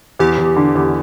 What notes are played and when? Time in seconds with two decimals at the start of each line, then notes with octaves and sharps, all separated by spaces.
0.19 E2 G4
0.38 E2
0.56 D3
0.75 E2